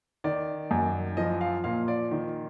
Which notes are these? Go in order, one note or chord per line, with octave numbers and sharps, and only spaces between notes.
D#3 D5
F#2
F3 D#5
F5
A#2 F5
D5
D#3